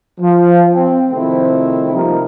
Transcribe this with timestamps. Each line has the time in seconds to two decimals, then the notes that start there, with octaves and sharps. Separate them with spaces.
0.20 F3
0.72 C4
1.11 C3 D#3 F3 A3 C4 E4
1.93 C3 F3 G3 A#3 D#4 A#4